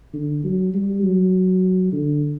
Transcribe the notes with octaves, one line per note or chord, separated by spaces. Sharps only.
D3
F#3
G3
F#3
D3